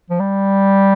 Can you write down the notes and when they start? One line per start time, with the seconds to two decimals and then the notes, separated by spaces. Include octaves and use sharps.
0.10 F3
0.20 G3